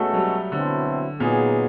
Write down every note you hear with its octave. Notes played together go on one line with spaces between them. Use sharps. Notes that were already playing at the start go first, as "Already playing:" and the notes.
Already playing: B2 G#3 A3 C#4 F#4 A4
F#3
G3
B2 D3 F#3 A3 C4 E4
A#2 F#3 B3 D#4 G#4